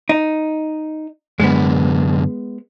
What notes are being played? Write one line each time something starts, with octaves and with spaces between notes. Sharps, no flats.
D#4
F#2 D3 G#3 B3